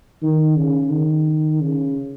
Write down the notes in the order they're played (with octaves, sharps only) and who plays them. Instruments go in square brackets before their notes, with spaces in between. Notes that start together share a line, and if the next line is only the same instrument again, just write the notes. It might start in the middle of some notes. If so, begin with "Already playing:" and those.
[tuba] D#3
C#3
D#3
C#3